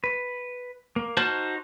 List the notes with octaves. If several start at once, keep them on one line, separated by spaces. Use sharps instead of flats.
B4
A#3
D#4 F#4 C5 A5 F6